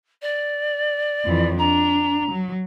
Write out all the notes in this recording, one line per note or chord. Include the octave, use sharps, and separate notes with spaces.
D5
F2 E3
D4 A#5
F#3